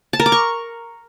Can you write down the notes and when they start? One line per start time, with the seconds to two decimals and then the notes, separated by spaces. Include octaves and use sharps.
0.13 A5
0.20 A#4
0.26 D6
0.32 C#6